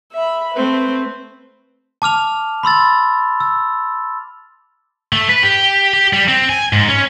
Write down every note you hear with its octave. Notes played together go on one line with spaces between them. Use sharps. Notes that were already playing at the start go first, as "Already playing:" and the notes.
E5 B5
A3 C4 B4
A5 D6 F6 F7
B5 C6 E6 A6
E6
A3
B4
G4
G4
G3
C4
G#5
G#2
C#4